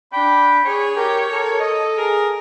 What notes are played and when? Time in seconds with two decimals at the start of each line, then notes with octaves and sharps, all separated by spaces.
0.13 D4 G5 B5
0.65 G#4 C#5
0.97 G4 A#4
1.32 A4 A#4
1.60 D#5
1.97 G#4 A#4